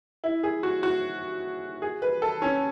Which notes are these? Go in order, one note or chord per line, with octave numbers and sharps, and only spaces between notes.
E4
G#4
F#4
F#4
G#4
B4
A4
C#4